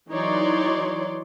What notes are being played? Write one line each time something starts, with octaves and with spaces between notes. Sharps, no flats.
E3 F#3 D#4 C#5 D5 C6